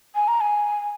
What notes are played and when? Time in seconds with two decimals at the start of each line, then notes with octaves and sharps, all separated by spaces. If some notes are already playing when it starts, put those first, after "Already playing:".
0.15 G#5
0.28 A#5
0.41 G#5